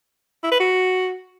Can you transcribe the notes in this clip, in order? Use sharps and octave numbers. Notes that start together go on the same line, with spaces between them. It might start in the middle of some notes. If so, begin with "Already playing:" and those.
E4
B4
F#4